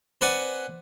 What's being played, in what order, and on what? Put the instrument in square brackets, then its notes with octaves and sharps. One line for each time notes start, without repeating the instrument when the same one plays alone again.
[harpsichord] C4 B4 D5 F#5 G#5